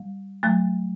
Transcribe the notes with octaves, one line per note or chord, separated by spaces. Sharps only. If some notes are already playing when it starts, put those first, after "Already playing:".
Already playing: G3
F#3 A3